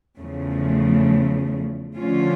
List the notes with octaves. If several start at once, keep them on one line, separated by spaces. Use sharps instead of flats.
E2 C#3 F3 A3
D3 F3 A3 C#4 F4